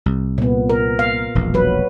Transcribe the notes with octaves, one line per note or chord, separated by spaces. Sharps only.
C2
A#2 B3
A#4
F5
E1 A#1
F#3 B4